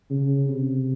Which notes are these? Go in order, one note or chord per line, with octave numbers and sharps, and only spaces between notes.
C#3
C3